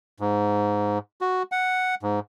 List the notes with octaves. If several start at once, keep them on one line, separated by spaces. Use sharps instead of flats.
G#2
F#4
F#5
G#2